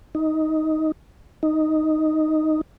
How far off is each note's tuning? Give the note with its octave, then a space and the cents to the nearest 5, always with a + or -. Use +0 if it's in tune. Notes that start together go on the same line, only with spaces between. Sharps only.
D#4 +10
D#4 +0